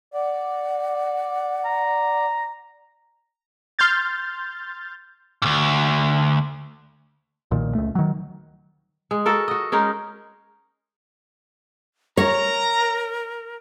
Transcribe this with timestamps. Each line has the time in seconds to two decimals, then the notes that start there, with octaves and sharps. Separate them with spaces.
0.14 D5 F#5
1.65 A#5
3.79 C6 F6 G6 A6
5.42 D2 G#2
7.51 B1 A#2 D#3
7.75 C#2 A3
7.95 D#3 F#3
9.11 G#3
9.26 F#4 A4 A#4
9.48 F#4 D#5
9.72 G#3 C#4 D#4 A#4
12.17 A#4 C#5 A#5